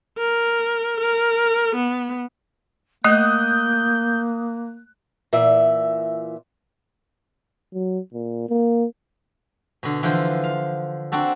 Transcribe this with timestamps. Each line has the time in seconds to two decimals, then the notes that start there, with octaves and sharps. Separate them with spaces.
0.18 A#4
1.00 A#4
1.75 B3
3.04 A3 A#3 D#5 D#6 F#6 G6
5.33 A#2 E3 E5
7.73 F#3
8.13 A#2
8.49 A#3
9.83 B2 D3
10.03 D3 E3 F3 F4 C5
10.43 F5
11.12 C4 D4 F#4 A4